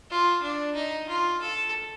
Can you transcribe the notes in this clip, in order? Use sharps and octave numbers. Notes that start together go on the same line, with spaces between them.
F4
D4
D#4
F4
A4